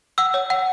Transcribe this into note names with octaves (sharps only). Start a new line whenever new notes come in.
F#5 E6
C#5
F#5